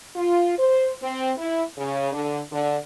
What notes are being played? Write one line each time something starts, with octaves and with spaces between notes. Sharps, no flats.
F4
C5
C4
E4
C#3
D3
D3